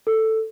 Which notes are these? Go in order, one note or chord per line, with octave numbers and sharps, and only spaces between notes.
A4